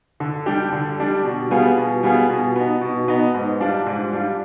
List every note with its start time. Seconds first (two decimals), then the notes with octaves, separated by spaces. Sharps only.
0.20 D3
0.46 G3 D4 G4
0.73 D3
0.99 G3 D4 G4
1.24 B2
1.50 G3 B3 F4 G#4
1.77 B2
2.03 G3 B3 F4 G#4
2.29 B2
2.56 B3 D#4
2.81 B2
3.08 B3 D#4
3.34 G#2
3.60 G3 D4 F4
3.86 G#2
4.13 G3 D4 F4